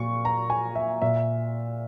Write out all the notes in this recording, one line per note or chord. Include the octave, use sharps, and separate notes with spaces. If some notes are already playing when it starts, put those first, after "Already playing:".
Already playing: A#2 C#6
A#5
G#5
E5
A#2 E5